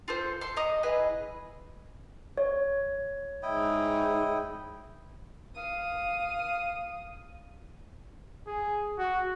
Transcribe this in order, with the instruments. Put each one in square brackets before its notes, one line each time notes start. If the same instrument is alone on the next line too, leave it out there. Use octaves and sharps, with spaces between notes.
[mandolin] F4 A4 C5
A4 C6
D#5 A#5 D#6
E4 G#4 B4 D#5
[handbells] C#5
[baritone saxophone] G#2 [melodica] E4 D#5 G5
[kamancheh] F5 D#6
[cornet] G#4
F#4